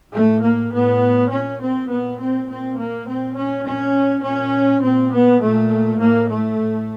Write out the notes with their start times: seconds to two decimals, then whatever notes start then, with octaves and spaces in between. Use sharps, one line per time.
0.13 A2 A3
0.42 A#3
0.72 A2 B3
1.30 A#2 C#4
1.59 C4
1.88 A#2 B3
2.18 C4
2.48 A#2 C4
2.77 A#3
3.06 A#2 C4
3.36 C#4
3.64 A#2 C#4
4.23 A#2 C#4
4.82 A#2 C4
5.12 B3
5.41 A#2 A3
5.99 A2 A#3
6.29 A3
6.57 A2